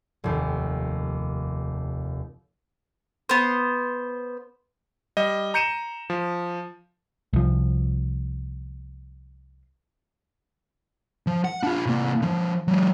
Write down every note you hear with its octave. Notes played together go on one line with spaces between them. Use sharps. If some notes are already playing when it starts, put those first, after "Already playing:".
F1 D#2
B3 C5
G3 D#5
A#5 G6 C#7 D#7 E7
F3
C2 F3
F3
F#5
D4 F4
C3 A#3
D3 F3
F#3 G#3